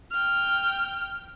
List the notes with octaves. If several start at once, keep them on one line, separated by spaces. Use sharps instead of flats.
G5 F6